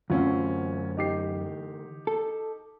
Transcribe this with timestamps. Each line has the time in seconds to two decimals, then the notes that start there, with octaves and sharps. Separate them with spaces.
0.10 F#2 D3 E3 A3 C4 C#4 F4
0.97 D#4 G4 C7
2.07 A4